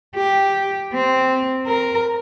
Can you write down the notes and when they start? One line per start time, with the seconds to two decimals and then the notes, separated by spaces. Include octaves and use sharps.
0.16 G4
0.93 C4
1.66 A#4